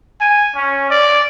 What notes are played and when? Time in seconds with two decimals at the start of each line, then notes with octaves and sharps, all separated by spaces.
0.20 G#5
0.56 C#4
0.90 D5